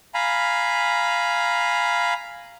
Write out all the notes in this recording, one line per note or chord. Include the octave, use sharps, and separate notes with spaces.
F5 G#5 A#5 B5